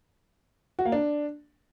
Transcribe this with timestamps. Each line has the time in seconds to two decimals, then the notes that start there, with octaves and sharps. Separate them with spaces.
0.79 F#4
0.85 A#3
0.92 D4